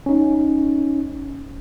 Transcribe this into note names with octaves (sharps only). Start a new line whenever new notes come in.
C#4 D#4